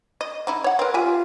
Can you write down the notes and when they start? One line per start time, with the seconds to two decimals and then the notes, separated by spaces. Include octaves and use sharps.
0.21 D#5
0.47 C#3 D#4 E4
0.64 C#5 F#5
0.79 C4 A#4 B4
0.94 F4 G4 E5 G#5